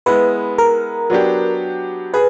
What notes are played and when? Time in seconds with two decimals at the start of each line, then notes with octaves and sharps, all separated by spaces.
0.06 G#3 B3 E4 B4
0.58 A#4
1.10 F#3 B3 D4 G4
2.14 G#4 B4